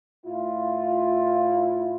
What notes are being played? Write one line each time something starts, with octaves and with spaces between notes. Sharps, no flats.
A2 E4 F4